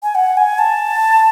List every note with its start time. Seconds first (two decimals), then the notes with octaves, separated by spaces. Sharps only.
0.03 G#5
0.15 F#5
0.37 G#5
0.59 A5